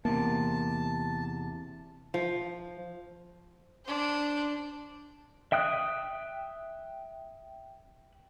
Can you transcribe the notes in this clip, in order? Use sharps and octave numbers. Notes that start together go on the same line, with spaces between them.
E2 C3 A#3 A5
F3
D4 C5
E5 G5 D#6 F#6